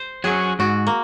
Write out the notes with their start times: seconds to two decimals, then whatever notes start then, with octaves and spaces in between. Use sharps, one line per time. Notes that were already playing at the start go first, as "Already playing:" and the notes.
Already playing: C5
0.24 F#3 C#4 F#4 G#4
0.59 G#2 F#4
0.87 A#3